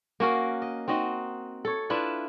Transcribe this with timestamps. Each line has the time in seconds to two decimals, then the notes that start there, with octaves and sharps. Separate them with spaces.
0.20 A#3 C#4 F#4 A#4
0.62 D#5
0.88 C4 D#4 F#4 D#5
1.65 A4 C#5
1.90 D4 E4 F4 B4